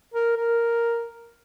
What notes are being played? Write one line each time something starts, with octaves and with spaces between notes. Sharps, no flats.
A#4
A#4